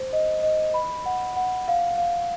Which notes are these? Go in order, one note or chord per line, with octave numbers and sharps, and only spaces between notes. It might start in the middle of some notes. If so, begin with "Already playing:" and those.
Already playing: C5
D#5
D#5
B5
F#5
F#5
F5
F5